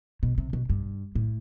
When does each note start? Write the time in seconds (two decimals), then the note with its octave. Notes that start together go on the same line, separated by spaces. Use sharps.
0.23 B2
0.38 C3
0.53 B2
0.70 G2
1.15 A2